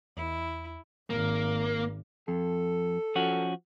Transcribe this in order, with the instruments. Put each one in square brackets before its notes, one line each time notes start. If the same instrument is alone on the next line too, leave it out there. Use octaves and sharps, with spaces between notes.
[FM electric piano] E2 [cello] E4
[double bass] G#1 [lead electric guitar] A#3
[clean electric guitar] F2 [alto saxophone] A4
[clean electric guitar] F3 C#4 F#4